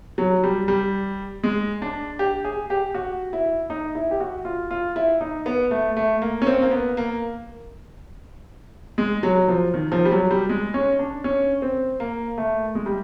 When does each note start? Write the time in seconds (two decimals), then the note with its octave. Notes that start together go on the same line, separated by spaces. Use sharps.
0.18 F#3
0.44 G3
0.68 G3
1.44 G#3
1.82 D4
2.19 G4
2.44 G#4
2.70 G4
2.94 F#4
3.33 E4
3.70 D#4
3.95 E4
4.11 G4
4.20 F#4
4.45 F4
4.71 F4
4.96 E4
5.21 D#4
5.46 B3
5.71 A3
5.97 A3
6.22 A#3
6.42 C#4
6.47 C4
6.62 A#3
6.71 B3
6.97 A#3
8.98 G#3
9.23 F#3
9.48 F3
9.74 D#3
9.92 F3
10.05 G3
10.12 F#3
10.31 G3
10.49 G#3
10.74 C#4
10.99 D4
11.24 C#4
11.62 C4
12.00 A#3
12.38 A3
12.75 G#3
12.86 G3